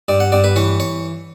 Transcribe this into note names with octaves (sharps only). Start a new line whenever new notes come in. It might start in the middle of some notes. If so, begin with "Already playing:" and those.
G2 D5
F#5
G2 D5
B4
E3 C#5
C#5